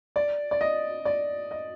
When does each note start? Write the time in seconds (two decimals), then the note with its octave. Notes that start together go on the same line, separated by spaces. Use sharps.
0.16 D5
0.51 D5
0.61 D#5
1.05 D5
1.51 D#5